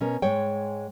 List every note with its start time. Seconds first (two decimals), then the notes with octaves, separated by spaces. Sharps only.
0.01 B2 C#4 A#4
0.22 G#2 G#3 C#5 G5